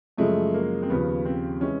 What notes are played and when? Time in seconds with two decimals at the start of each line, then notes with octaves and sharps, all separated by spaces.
0.18 F#2 C#3 F3 G#3 A3
0.54 A#3
0.82 C4
0.90 D#2 C#3 F3 B3
1.25 C4
1.61 C3 E3 G#3 C#4